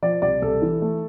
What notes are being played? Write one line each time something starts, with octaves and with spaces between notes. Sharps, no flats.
F3 D5
C2 D5
C2 A4
E3
A3